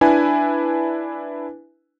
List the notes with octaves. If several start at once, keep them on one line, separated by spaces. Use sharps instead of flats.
D4 E4 B4 G#5